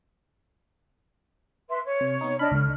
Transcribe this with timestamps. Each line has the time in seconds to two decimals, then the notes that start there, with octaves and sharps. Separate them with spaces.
1.69 B4 E5 C6
1.84 C#5
2.01 C3
2.21 B3 D#4
2.39 D4 D#5 B5 F6
2.51 C#2 D3 F6